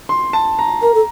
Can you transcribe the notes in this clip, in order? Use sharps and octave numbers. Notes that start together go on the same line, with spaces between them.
C6
A5
A#5
A#4 A#5
A4